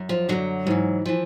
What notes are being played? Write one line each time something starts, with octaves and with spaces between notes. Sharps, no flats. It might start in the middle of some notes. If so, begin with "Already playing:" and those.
Already playing: F#2
F3
F#2 D3 F#3
G#2 E3
E3 F3